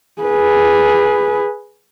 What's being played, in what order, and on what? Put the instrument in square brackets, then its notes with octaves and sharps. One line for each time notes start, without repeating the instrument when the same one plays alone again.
[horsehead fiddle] G#4 B4